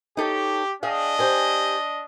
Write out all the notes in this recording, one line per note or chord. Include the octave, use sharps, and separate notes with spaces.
D#4 G4 A4 C#5
D4 G#4 D#5 F5 G5
G4 C5 G#5